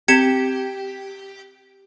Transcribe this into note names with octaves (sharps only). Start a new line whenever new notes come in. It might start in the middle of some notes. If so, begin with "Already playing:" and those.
C4 G4 G#6 C#7 E7